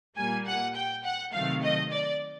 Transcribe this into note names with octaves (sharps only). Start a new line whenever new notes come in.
A#2 G3 A#3 G#5
F#5
G5
F#5
C3 D#3 F#3 A3 F5
D#5
D5